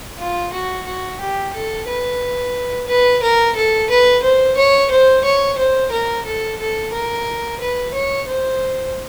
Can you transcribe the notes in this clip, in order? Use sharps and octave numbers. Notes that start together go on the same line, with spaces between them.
F4
F#4
F#4
G4
A4
B4
B4
A#4
A4
B4
C5
C#5
C5
C#5
C5
A#4
A4
A4
A#4
B4
C#5
C5